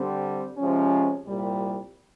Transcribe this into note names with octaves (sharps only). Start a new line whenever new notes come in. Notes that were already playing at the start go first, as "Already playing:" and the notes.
Already playing: D3 G3 C4
C3 F3 G#3 C#4
C2 A#2 G3